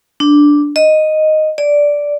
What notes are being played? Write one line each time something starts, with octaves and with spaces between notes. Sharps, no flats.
D4
D#5
D5